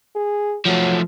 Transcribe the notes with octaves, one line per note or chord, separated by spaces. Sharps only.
G#4
F3 F#3 A3